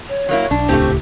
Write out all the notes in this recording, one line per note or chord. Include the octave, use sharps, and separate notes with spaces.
C#5
F#3 A#3 E4
B1 D4
D#1 C#2 A2 A3 C4 G4